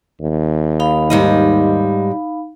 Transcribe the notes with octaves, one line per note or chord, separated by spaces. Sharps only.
D#2
D#4 F5 B5
G#2 G3 D#5